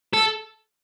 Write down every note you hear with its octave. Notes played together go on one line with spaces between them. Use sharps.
A4